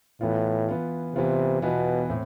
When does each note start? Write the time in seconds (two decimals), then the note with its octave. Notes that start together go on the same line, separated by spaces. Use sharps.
0.21 A2 E3 B3 F4
0.69 E3 B3 F4
1.15 C3 E3 B3 F4
1.62 B2 E3 B3 F4
2.10 A2 C4